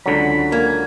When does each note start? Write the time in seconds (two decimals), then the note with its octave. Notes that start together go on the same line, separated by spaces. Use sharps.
0.06 C#2 D3 F#3 B5
0.52 A#3 G#5